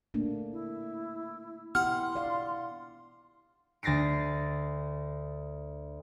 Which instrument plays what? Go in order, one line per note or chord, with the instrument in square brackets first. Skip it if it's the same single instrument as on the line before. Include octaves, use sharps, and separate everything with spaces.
[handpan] A3 A#3 D4
[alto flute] E4
[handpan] B3 E4 G4 [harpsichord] F#5 [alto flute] C6 [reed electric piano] F6
[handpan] D5 F5
[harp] D2 A6 A#6 C7 D7